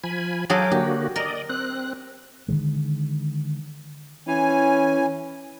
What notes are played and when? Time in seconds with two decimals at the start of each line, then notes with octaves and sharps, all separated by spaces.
0.04 F3 G#5 B5
0.50 F#3 G#4 A4 F5 G5 D6
0.71 D3 A#3 F#4 G4
1.16 A#4 D5 D#5
1.49 C4 F#6
2.48 D3 D#3 G#3
4.28 E3 C#4 G#5